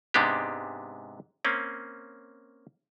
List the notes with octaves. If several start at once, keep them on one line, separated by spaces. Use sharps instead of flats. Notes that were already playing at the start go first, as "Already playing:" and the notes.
G#2 C3 G#3 B3 D4 G4
A#3 C4 C#4